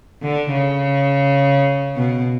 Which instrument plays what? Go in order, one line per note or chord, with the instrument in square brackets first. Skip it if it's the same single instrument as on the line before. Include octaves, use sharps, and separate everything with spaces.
[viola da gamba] D3
C#3
B2